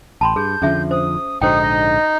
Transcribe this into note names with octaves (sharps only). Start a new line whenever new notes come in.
A1 G5 A5 B5 C6
G2 G#4 G6
F2 D3 F3 C#4 G#4 E5
C5 D#6
A#1 G#2 D3 D#4 F#4 C5 G5 D#6
D#5